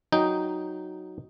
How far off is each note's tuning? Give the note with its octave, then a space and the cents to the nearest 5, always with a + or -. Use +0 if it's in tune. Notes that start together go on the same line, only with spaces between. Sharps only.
F#3 +0 D#4 +0 G5 +0